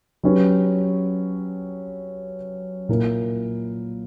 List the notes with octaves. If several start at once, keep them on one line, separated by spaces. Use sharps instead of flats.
F#3 C#4 G4 B4
A#2 A#3 E4 A#4